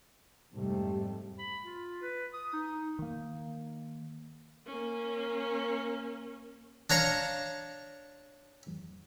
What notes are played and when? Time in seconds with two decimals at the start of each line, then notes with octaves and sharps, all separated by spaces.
0.52 F2 G#2 C3 G3 A3
1.39 B5
1.64 F4
2.02 B4
2.33 D#6
2.53 D#4
2.99 D#3 A#3
4.66 A#3 C#4
6.90 D4 C#5 F5 A#5 C#6